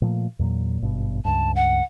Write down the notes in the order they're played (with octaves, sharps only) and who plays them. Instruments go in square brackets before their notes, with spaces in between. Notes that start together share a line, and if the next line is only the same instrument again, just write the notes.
[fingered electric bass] A#2 F3 A3
E2 A#2 F#3
G#1 G2 B2
[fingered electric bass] C#2 G2 [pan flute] A5
[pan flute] F#5